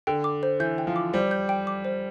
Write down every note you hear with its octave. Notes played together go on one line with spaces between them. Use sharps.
D3 G5
D6
C5
E3 G6
G5
F3
D6
G3 C5
G6
G5
D6
C5